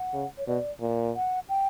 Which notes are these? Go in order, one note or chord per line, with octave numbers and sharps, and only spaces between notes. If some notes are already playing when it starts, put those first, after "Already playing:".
Already playing: F#5
C#3
C#5
B2 D5
A#2
F#5
G5